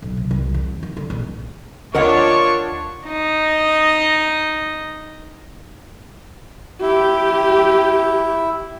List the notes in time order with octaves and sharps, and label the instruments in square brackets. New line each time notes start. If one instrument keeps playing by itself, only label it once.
[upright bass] B1
C3
C2
E2
D#3
D3
A#1
[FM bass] D2 [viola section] D4 F4 C#5 [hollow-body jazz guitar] A#4 D#5 F#5 [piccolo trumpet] C#6
[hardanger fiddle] D#4 D#5
[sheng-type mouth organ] E4 [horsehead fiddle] G4